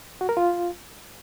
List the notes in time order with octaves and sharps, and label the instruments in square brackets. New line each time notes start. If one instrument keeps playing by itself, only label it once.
[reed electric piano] F#4
A#4
F4